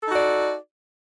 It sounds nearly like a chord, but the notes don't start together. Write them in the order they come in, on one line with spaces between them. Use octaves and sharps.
A4 D#4 F#4 D5